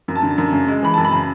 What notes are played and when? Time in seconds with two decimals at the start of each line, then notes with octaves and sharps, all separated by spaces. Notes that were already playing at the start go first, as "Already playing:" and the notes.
0.08 F#2
0.16 A5
0.23 D3
0.38 F#2
0.53 C#3
0.68 G#3
0.82 E3 B5
0.94 F#2 A5
1.05 B5
1.12 C#3